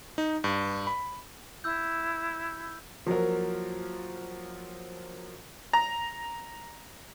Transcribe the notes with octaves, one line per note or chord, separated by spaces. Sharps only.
D#4
G2
B5
E4 E6 G6
F3 F#3 A#3 A#4
A#5